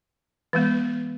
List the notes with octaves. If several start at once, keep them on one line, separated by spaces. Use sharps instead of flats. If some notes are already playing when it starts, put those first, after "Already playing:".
E3 G#3 B3